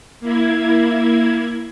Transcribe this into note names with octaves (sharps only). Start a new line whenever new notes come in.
A#3 E4 G#6